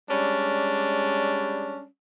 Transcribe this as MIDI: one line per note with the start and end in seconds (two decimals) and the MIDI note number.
0.10 1.86 55
0.10 1.86 56
0.10 1.86 61
0.10 1.86 62